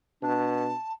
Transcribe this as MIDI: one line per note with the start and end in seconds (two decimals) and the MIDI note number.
0.23 0.72 47
0.23 0.72 62
0.23 0.92 81